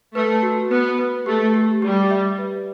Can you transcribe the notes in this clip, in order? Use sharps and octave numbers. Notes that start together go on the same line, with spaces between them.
A3 B4
F#4
B3 B4
B4
A3 G4
G4
G3 G4
E5
B4